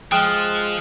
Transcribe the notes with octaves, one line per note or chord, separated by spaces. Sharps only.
F3 G#3 G5 D#6 F6 F#6